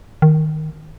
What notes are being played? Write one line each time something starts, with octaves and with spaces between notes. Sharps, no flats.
D#3